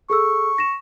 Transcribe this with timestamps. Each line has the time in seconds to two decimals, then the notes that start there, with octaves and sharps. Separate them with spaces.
0.10 G#4 A4 C#6 E6
0.58 A#6 E7